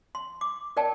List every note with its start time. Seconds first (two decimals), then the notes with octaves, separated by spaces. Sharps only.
0.15 C6
0.41 D6
0.77 A#4 D5 G5 A5